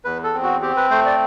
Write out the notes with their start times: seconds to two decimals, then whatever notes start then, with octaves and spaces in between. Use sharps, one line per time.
0.05 E2 B4
0.24 A4
0.34 C4
0.43 F#4
0.61 C4 G4
0.77 B4
0.90 A3 C5
1.06 D5